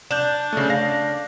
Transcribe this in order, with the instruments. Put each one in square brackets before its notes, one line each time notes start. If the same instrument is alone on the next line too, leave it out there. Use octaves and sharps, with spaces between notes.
[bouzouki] D4 [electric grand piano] G6 E7
[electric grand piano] C#3 A3
F5 A#6